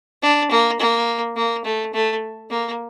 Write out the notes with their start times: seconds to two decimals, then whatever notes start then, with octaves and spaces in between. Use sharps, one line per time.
0.22 D4
0.50 A#3
0.79 A#3
1.36 A#3
1.64 A3
1.93 A3
2.50 A#3